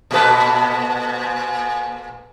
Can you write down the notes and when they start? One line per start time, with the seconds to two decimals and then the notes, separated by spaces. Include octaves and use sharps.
0.11 A#2 A3 B4